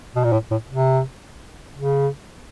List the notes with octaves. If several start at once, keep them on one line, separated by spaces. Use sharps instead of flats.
B2
A#2
A2
A2
C3
C#3